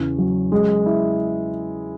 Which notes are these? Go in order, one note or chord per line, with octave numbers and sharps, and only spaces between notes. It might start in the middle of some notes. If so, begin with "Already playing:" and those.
Already playing: E2 C#3
F#3
G#3
E4